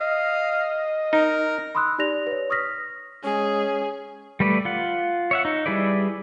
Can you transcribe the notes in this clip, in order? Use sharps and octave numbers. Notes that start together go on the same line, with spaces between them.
D#5 F5
D#4 A#4
B5 C6 D#6 E6 F#6
D#4 G4 D5 A#6 F7
B4 C#5
C#6 D#6 F6 A#6 B6
G#3 C#4 G#4
G3 A3 B4 D5
F4 F#5
C#5 E5 F#5
D#4
G3 E4 G#4 B4 D5